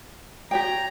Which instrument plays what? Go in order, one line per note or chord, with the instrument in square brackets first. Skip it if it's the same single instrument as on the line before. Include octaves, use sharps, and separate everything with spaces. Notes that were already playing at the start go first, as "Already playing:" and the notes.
[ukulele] G4 C#5 G5 [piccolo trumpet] A#5